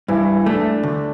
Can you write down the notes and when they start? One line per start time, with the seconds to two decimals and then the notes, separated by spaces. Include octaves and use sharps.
0.08 G2 E3 E4
0.39 E4
0.46 A3 D4
0.83 D2